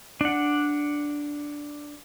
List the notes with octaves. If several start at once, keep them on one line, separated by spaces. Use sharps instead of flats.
D4 F#5